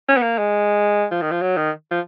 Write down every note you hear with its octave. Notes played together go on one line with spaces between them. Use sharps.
C#4
B3
A#3
G#3
F3
D#3
F3
F#3
D#3
F3